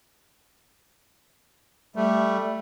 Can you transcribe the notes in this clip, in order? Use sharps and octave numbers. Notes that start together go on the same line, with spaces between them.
G3 A3